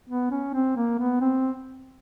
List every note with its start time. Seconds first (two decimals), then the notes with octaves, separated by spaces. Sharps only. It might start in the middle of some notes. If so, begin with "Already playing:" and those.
0.09 B3
0.31 C#4
0.54 C4
0.77 A#3
0.99 B3
1.21 C4